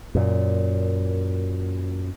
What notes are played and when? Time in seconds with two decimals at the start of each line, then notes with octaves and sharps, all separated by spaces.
0.15 F#2 A#2